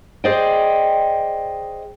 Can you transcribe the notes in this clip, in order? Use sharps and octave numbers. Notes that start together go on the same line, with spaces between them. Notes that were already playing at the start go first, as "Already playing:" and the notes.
G#4 C5 D5 D#5 G5